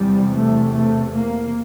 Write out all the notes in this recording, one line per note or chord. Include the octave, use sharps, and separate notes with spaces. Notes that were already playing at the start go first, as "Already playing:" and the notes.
Already playing: E2 C3 G3
A3
A3
A#3